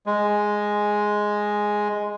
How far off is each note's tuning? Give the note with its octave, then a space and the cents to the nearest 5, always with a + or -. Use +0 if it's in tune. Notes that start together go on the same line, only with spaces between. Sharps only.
G#3 +0